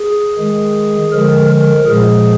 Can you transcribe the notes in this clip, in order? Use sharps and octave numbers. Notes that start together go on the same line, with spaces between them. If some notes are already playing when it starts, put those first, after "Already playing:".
Already playing: G#4
D#3 G#3
D3 F3 G#3 A#4
A#4
A#2 F3 G#3 G#4